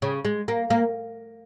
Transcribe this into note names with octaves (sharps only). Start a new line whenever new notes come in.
C#3
G#3
A#3
A#3